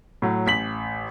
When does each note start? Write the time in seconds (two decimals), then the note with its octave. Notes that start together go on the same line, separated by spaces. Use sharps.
0.22 A2 F#3
0.47 A1 B6 F#7